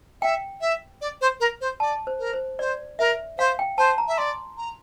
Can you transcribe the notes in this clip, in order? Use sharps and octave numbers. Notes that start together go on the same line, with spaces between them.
E5 G5
E5
D5
C5
A#4
C5
D5 A5
C5
A#4
C5
C5 D5
A#4 E5
C5 F5
G5
C5 A5
A#5
E5
D5 C6
A#5